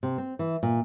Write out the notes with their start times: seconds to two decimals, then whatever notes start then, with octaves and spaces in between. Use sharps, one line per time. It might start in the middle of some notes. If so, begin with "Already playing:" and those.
0.03 C3
0.18 C4
0.39 E3
0.63 A#2